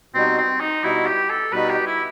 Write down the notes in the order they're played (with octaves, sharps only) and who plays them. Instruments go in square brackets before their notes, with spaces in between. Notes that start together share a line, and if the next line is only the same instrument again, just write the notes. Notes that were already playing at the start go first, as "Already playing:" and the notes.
[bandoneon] B2 G3 D#4 F#4 [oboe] C4
[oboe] C4
D#4
[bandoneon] B2 G3 D#4 F#4 [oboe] E4
[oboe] G4
A4
[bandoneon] B2 G3 D#4 F#4 [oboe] B4
[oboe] G4
E4